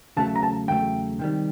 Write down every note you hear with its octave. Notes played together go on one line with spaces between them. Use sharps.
E2 C#3 F#3 A3 A5
A#5
A5
E2 C#3 F#3 A3 G5
C3 D#3 G3